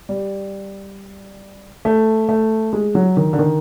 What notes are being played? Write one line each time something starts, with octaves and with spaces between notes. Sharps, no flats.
G3
A3
A3
G#3
F#3
D#3
D3
D#3